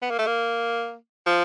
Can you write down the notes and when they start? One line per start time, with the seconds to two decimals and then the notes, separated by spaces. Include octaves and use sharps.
0.02 B3
0.10 A#3
0.18 A3
0.27 A#3
1.26 F3